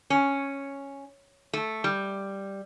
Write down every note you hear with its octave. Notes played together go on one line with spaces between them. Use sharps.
C#4
A3
G3